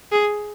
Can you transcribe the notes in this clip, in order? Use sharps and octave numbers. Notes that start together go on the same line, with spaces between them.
G#4